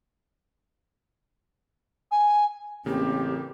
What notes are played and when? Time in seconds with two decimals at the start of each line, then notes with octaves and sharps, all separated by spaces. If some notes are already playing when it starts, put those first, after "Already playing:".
2.11 G#5
2.86 A1 C#3 A#3 C4 G4